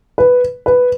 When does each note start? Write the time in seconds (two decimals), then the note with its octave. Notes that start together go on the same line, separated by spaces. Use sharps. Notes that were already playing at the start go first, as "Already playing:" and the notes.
0.18 B4
0.66 B4